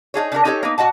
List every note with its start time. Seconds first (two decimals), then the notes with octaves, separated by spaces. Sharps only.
0.14 D#4 F4 G#4 C#5
0.32 C#3 D4 E4 A#4
0.45 C#4 D#4 G4 A4 B4 C#5
0.63 A#3 B3 D#4
0.78 A#2 F#4 D#5 F#5 A5